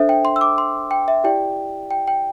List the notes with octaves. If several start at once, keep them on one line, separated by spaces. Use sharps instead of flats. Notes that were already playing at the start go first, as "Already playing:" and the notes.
Already playing: D4 A4 C5 E5
G5
C6
E6
D6
C6
G5
E5
E4 G4 D5 G5
G5
G5